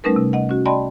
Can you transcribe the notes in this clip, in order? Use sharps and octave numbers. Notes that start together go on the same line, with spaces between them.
G3 A3 C#4 D#4 A#4 B4
C3
D#5 F#5
C#4 F#4
D5 D#5 G5 A5 B5 C6